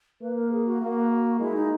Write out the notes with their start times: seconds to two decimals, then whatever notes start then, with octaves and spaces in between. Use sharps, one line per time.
0.21 A#3 B4
0.36 A#4
0.52 G#4
0.66 F#4
0.81 A#3
1.40 G#3 E4
1.55 D#4